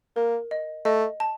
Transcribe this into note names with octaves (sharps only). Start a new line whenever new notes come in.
A#3 A#4
D#5
A3 D#5
A5